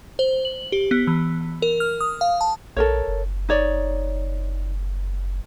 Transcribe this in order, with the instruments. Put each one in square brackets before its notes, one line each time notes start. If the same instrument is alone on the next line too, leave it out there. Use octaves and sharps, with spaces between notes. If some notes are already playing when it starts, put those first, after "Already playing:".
[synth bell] C5
F#7
G4
B3
E3
A#4
F6
D#6
F5
A5
[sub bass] A#1 [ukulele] A4 A#4 C#5
[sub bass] F#1
[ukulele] D#4 C#5 D5